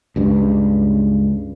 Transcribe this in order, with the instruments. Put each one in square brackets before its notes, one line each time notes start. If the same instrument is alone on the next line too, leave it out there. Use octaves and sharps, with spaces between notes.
[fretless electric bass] C#2 G2